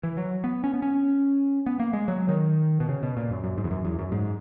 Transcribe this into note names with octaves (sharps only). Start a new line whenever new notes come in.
E3
F#3
B3
C#4
B3
C#4
B3
A#3
G#3
F#3
D#3
B2
C#3
B2
A#2
F#2
F#2
G#2
E2
F#2
E2
F#2
G#2